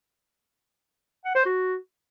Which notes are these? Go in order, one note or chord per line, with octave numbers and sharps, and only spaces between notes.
F#5
C5
F#4